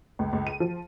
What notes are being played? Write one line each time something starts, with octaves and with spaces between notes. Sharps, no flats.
C#2
C#2
D#7
F3